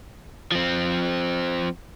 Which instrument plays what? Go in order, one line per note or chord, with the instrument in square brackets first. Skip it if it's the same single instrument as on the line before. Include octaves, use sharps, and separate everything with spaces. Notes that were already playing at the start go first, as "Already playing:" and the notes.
[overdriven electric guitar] F3 C4